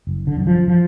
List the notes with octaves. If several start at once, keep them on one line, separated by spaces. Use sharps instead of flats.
F#1
D3
F#2 D3
F3
F3